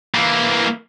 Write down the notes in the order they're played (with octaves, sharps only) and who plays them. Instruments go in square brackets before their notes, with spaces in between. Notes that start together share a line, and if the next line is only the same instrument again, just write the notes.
[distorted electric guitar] E3 A#3